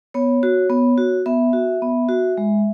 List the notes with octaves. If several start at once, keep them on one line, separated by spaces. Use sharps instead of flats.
B3 C#5
F#4
B3
F#4
B3 E5
F#4
B3
F#4
G#3